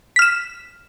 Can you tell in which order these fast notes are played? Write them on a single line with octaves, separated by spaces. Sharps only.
B6 F6 E7